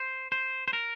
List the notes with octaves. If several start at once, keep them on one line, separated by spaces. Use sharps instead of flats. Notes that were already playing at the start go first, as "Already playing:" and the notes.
Already playing: C5
C5
C5
A#4